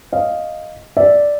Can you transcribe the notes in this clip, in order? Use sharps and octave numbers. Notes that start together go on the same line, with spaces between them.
D#5 F5
D5 E5